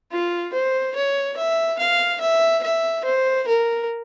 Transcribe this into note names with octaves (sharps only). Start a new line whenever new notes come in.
F4
C5
C#5
E5
F5
E5
E5
C5
A#4